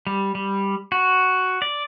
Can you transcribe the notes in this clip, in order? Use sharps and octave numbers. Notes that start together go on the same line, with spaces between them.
G3
G3
F#4
D5